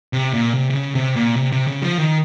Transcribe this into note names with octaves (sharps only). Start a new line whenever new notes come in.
C3
A#2
C3
C3
C#3
C3
A#2
C3
C3
C#3
F3
D#3